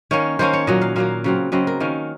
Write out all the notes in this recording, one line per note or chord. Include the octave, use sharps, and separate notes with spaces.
D#3 A#3 C#4 C#5
D#3 A#3 C#4 C5
C#5
A#2 F#3 A#3 D#5
F5
A#2 F#3 A#3 F5
C#3 F#3 C4
C#3 F#3 C4 D#5
A#4
D#3 A#3 C#4